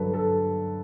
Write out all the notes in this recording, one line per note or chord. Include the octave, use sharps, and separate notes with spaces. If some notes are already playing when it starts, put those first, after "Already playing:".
Already playing: G2 D3 F#3 A4 B4
A4